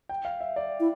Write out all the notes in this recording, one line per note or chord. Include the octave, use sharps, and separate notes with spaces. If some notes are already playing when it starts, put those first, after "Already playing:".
G5
F5
E5
D5
E4